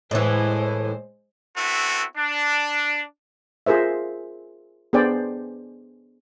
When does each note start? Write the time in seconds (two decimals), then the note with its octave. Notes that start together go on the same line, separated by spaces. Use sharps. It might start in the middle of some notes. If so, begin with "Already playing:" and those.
0.11 A2 E3 G#3 C5
1.56 B3 C4 E4 F#4 A4
2.17 D4
3.66 F4 G#4 A#4 C5 E5
4.93 B3 D4 G#4 C5 D5 G5